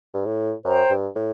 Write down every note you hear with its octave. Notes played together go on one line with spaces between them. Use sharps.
G2
A2
F#2 C5 G5 A#5
G2
A2